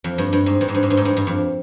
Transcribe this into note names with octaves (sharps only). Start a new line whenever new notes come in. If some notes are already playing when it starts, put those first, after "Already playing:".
F2
G2
G2
G#2
G2
G#2
G2
G#2
G2
G#2
G2
G2
F2